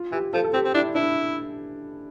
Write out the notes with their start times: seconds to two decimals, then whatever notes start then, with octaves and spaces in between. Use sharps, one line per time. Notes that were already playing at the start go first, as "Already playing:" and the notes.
Already playing: F4
0.12 E3 G4
0.33 F3 A4
0.44 A4
0.53 C4 G4
0.64 C4
0.74 D4 E4
0.95 D4 E4